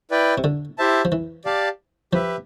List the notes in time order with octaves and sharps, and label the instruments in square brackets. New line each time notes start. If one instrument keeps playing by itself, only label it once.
[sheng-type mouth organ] E4 B4 D5 G5
[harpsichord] C3
D3
[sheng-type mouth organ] E4 G4 C5 E5 A5
[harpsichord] F3
E3
[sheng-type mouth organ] G4 D5 F5 A5
[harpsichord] F3 [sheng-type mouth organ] G4 B4 E5